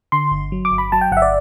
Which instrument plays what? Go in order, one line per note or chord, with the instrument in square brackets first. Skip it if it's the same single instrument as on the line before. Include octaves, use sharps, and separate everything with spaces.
[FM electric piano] D3 C6
G1
F#3
D6
G1
B5
F#3 A5
G5
G1 F#5
E5
D5